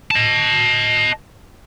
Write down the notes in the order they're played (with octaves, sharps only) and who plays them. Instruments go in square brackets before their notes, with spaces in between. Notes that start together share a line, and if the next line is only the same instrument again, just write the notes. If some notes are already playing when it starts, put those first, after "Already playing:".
[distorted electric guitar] D#5 A5